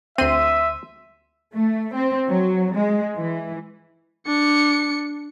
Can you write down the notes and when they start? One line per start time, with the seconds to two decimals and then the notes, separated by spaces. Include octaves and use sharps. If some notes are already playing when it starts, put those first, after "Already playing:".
0.18 D2 C4 E5 C6 D#7
1.54 A3
1.95 C4
2.28 F#3
2.74 G#3
3.16 E3
4.27 D4 C#7